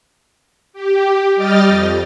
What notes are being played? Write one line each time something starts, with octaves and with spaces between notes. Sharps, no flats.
G4
G3 D#5 G5 F6 A6
F2